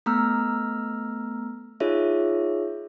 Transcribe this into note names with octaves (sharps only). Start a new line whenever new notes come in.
A3 B3 A#5 E6 F6
D#4 F4 G#4 C#5 E5